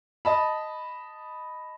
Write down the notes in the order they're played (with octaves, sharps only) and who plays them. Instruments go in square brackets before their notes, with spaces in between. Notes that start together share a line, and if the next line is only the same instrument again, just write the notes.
[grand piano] D#5 A5 B5